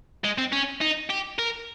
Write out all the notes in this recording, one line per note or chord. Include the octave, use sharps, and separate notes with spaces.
G#3
C4
C#4
D#4
G4
A#4